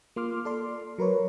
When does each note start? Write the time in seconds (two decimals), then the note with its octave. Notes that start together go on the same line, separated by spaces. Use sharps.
0.16 A#3 F4 C6 D6 F6
0.45 A4 D5 C6
0.98 F#3 A#4 B4 C#5